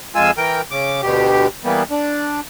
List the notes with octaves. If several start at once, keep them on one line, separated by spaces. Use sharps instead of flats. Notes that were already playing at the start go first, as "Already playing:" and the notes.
F2 G#3 F4 G#5 E6
E3 A#4 G5
C#3 D6
D2 B2 G4
E3 G3 A#3 B3
D4